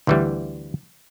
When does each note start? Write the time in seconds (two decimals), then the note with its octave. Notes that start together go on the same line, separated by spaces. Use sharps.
0.07 D2 E3 G3